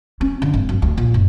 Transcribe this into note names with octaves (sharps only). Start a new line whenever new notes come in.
C#4
D3
G#1
F#2
D2
A#2
F#1